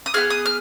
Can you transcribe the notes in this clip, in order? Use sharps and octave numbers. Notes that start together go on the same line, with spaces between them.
D#6
B3 F4 G#4 F6
D#6
F6